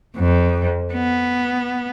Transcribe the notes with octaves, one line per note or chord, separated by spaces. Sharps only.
F2
B3